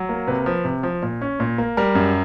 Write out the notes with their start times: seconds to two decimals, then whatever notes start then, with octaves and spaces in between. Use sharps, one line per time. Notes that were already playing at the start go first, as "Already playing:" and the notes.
Already playing: F#3
0.09 A#3
0.28 C3 B4
0.46 F3
0.65 C3
0.83 F3
1.02 A#2
1.21 C#4
1.40 A#2
1.58 A#3
1.77 G3 A#4
1.95 F#2